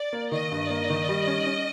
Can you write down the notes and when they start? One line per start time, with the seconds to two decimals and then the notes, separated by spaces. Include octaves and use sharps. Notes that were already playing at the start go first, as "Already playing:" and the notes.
Already playing: D5
0.13 A#3
0.32 D#3 D#5
0.51 G2
0.70 A#3
0.90 D#3
1.09 G3
1.27 C#4
1.46 C#4